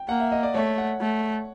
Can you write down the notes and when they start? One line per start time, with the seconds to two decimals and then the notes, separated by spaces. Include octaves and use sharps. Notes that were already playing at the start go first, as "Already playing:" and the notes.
Already playing: G5
0.09 A#3 F#5
0.20 E5
0.32 D#5
0.43 D5
0.54 A3 C#5
0.78 F#5
1.01 A3